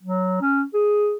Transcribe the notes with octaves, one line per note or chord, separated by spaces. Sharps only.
F#3
C#4
G#4